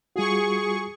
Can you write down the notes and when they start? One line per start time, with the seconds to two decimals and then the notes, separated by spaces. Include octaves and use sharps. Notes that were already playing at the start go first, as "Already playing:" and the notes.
0.16 G3 F4 F#4 G#4 C#6